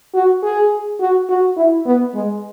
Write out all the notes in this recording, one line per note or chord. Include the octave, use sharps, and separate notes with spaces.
F#4
G#4
F#4
F#4
E4
B3
G#3